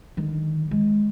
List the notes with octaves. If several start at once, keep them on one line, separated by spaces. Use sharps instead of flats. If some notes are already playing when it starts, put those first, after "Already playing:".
D3 D#3
G#3